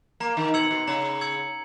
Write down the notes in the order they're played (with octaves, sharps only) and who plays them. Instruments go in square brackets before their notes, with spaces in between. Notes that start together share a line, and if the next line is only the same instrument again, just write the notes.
[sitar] A#3 [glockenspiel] A#5
[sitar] D#3
[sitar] B2 [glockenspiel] E6 G#6 C#7 F#7
[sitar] B2
[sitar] C#3 [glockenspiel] A#5
[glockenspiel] E6 G#6 C#7 F#7